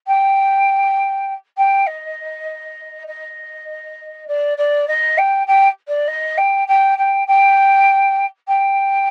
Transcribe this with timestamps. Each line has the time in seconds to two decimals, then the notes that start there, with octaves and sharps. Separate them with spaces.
0.07 G5
1.58 G5
1.87 D#5
3.07 D#5
4.28 D5
4.58 D5
4.88 D#5
5.18 G5
5.47 G5
5.88 D5
6.08 D#5
6.38 G5
6.68 G5
6.98 G5
7.28 G5
8.48 G5